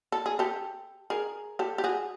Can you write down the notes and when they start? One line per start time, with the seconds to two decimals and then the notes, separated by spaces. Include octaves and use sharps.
0.12 A4
0.26 G#4
0.39 G4 A4
1.10 G#4 A#4
1.59 G4 A4
1.78 G4
1.84 F#4 G#4